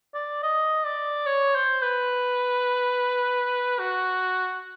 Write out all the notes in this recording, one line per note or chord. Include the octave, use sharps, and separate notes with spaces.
D5
D#5
D5
C#5
C5
B4
F#4